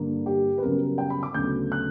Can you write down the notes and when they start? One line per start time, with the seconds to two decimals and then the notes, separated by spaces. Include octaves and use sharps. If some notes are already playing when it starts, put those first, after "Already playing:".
Already playing: G2 D3 A#3
0.26 G4
0.58 B4
0.62 F#2 C#3 G3 B3 A#4
0.98 G5
1.10 B5
1.23 D6
1.34 D2 C#3 F#3 B3 G6
1.72 F#6